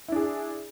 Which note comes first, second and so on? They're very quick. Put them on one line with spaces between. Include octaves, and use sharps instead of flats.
E4 D4 G#4